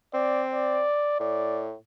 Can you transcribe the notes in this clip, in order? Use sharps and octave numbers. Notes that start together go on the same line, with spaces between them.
C4 D5
D5
A2 D5